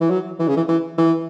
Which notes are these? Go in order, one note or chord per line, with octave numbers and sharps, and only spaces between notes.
E3
F#3
E3
C#3
E3
E3
E3